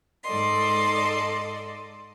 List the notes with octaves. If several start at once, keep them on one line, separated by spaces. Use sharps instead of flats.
G#2 A4 D5 D#5 C6